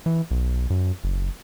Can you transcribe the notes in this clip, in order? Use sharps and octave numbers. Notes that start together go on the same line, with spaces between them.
E3
B1
F#2
F#1